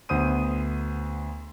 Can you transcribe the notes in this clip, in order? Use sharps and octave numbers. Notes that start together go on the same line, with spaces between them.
D2 B3 C5 D#6 D#7